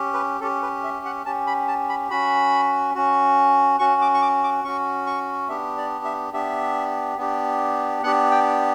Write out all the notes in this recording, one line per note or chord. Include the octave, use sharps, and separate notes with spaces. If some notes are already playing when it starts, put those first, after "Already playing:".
Already playing: C#4 G4
B4
C#4 G4 A4
B4
E5
F#5
C#4 G4 A5
B5
A5
B5
C#4 F#4 B5
C#4 F#4
C#4 F#4 C#6
D6
C#6
D6
D6
C#4 F#4 C#6
C#6
B3 D4 G4 E5
D5
E5
B3 D4 G4 E5
B3 D4 G4
B3 D4 G4 F#5
G5